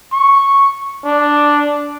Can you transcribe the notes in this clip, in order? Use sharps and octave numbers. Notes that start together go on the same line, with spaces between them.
C#6
D4